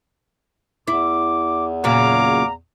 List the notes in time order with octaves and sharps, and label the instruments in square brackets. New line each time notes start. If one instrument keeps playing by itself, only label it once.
[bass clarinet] E2 [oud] E4 [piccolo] D6
[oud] A#2 C#3 F#3 [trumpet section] F5 D6 [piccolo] A#5